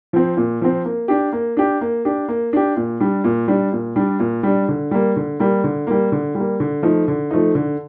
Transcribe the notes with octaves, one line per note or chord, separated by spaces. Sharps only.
F3 C4
A#2
F3 C4
A#3
D4 G4
A#3
D4 G4
A#3
D4 G4
A#3
D4 G4
A#2
G3 D4
A#2
G3 D4
A#2
G3 D4
A#2
G3 D4
D3
G3 A#3
D3
G3 A#3
D3
G3 A#3
D3
G3
A#3
D3
F3 A3 D#4
D3
F3 A3 D#4
D3